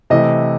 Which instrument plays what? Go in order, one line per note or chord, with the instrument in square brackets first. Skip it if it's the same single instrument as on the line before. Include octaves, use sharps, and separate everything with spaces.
[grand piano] C3 E3 A3 D#5